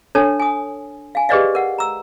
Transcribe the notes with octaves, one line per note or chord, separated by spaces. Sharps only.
D4 A4 C#5 A5
G#5 D#6
F5 G#5
G4 G#4 B4 D5 D#5 F5
A#4 F#5
A#5 E6